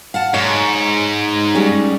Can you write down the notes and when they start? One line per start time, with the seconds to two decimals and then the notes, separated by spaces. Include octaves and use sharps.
0.14 F5 F#5 A5
0.34 G#2 C#5
1.55 G3 G#3 C#4